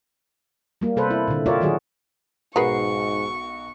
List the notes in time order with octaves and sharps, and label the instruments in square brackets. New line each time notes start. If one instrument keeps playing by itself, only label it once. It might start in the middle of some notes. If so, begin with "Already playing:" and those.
[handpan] G3 A#3
C3 A4 B4 C5
E4
A#2 D3
F4 G4 A#4 C#5 D5 E5
D#3 F#3 F#4 G#4
[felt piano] B1 F#4 C7 [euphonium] G#2 [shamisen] G#3 A#4 B4 [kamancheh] C#6